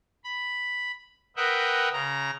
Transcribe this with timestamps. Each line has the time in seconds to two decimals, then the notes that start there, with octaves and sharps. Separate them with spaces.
0.24 B5
1.36 A#4 B4 D#5 E5 F#5 G5
1.93 C#3 A#5